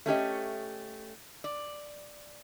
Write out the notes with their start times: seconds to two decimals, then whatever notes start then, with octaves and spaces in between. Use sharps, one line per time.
0.06 A3 C#4 G4 D#5
1.44 D5